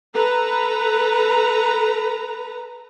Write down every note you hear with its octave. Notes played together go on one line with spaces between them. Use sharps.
A4 B4 A#5